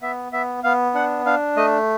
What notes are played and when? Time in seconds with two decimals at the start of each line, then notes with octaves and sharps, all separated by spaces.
0.02 B3 E5
0.32 B3 E5
0.64 B3 F5
0.94 D4 F#5
1.25 D4 F5
1.57 A3 D#5